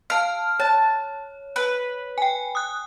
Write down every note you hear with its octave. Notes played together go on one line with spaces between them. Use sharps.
F5 A5 F6
C#5 A5
B4
G5 G#5
D#6 F#6